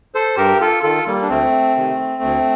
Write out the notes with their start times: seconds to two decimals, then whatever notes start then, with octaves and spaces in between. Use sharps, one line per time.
0.15 A4 C5
0.37 G2 G4 A#4
0.61 F4 A4
0.83 D#3 F4 A4
1.07 G3 A#3
1.22 D4
1.29 D2 A3 C4
1.76 C3 D#3
2.22 D2